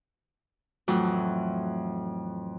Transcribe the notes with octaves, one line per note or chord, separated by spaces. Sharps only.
F2 A2 E3 F#3